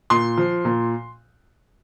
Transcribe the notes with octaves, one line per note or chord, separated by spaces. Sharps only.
A#2 C6
F3
A#2